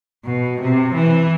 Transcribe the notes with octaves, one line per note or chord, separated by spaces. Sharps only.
B2
C3
E3